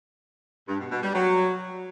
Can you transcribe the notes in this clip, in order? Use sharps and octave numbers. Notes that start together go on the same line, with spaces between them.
G2
B2
B2
G3
F#3